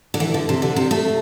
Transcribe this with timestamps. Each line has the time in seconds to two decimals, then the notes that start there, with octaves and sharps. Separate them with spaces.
0.14 D3
0.20 E3
0.34 D3
0.49 C3
0.62 D3
0.76 C3
0.91 A3